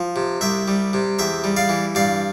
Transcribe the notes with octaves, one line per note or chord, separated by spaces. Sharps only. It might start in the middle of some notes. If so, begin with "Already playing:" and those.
Already playing: F3
C3
C2 E5 G5
G3
C3
E2 E5 G5
G3
D5 F5
E3
G2 D5 F5